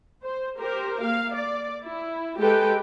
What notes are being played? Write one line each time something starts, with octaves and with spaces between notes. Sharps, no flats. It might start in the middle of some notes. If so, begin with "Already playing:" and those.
C5
G4 A#4 C5
A#3 F5
D5
E4
G#3 G4 A4 B4 G5